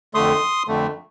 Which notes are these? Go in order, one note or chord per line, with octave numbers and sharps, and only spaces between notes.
F2 D3 A3 C6 D#6
F2 D3 A3